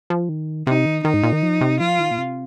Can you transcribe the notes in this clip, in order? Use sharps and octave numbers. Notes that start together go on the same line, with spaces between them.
F3
D#3
C3 D#4
D#3
D#3 D#4
G#2
A#2
D#3
F3
C3
F3 F4
D#3
A#2
C3